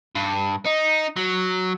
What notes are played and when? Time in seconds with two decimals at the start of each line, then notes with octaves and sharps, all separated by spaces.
0.15 G2
0.65 D#4
1.16 F#3